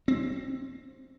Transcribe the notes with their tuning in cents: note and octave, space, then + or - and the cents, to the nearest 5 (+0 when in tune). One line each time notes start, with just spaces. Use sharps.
C4 +10